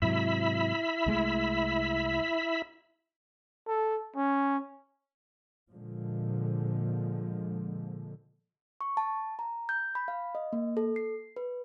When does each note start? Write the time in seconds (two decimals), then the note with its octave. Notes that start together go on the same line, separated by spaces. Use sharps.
0.02 G#2 C3 F#3 E4 E5 B5
1.06 C2 G#3 A3
3.67 A4
4.16 C#4
5.72 A#2 D3 F3 G#3
8.81 C#6
8.97 A5
9.39 A#5
9.69 G6
9.95 B5
10.08 F5
10.35 D#5
10.53 A#3
10.77 A4
10.96 C7
11.36 B4